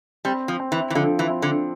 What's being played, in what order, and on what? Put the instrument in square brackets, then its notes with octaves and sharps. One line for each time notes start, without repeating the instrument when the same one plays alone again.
[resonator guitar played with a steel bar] G3 [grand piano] C4
[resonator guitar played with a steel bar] F3
[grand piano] C4
[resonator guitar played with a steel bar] E3
E3
[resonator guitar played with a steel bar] D3 [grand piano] F3
[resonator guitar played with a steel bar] E3
[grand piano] C4
[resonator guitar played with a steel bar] D3